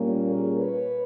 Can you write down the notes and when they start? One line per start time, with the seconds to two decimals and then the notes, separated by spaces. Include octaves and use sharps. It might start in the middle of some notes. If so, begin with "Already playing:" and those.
Already playing: A#2 G3 A#3 C#4
0.31 G#4 A#4
0.60 B4 C#5